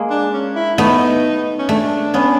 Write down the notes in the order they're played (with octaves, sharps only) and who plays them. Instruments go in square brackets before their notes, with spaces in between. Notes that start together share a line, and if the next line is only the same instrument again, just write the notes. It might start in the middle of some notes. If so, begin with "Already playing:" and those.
Already playing: [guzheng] G#3 A#3
[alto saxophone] D4
C#4
E4
[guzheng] A3 B3 [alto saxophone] D#4
[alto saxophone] C#4
[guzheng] A3 [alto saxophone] D4
[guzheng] B3 C#4